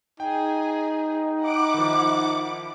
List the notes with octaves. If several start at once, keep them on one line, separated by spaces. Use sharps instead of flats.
D#4 G#4 G5
E4 F#5 D6
D#3 F3